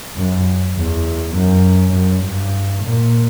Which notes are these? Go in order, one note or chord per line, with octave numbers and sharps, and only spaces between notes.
F#2
E2
F#2
F#2
G2
A#2